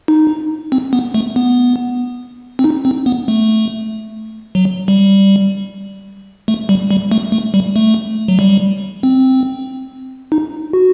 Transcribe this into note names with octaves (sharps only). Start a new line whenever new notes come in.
D#4
C4
B3
A3
B3
C4
D#4
C4
B3
A3
F#3
G3
A3
G3
G3
A3
A3
G3
A3
F#3
G3
C4
D#4
F#4